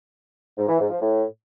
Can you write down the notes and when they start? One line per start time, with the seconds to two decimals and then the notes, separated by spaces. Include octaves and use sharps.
0.57 G#2
0.68 E3
0.79 G#2
0.90 F3
1.01 A2